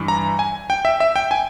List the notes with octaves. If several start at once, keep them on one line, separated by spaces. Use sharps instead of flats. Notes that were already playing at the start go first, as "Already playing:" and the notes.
Already playing: G2 E3
A#5
G#5
G5
E5
E5
G5
G#5